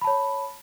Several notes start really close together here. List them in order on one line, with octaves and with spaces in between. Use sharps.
B5 A5 C#5